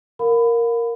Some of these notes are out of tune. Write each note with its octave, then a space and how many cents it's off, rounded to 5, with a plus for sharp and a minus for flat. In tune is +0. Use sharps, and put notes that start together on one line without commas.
A#4 +0 F5 +35 B5 +20